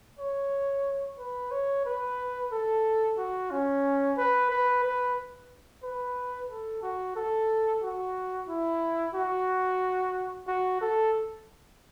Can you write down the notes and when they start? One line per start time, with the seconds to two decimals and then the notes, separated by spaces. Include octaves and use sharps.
0.19 C#5
1.19 B4
1.51 C#5
1.85 B4
2.52 A4
3.18 F#4
3.51 C#4
4.18 B4
4.51 B4
4.84 B4
5.83 B4
6.49 A4
6.82 F#4
7.16 A4
7.83 F#4
8.48 E4
9.15 F#4
10.48 F#4
10.81 A4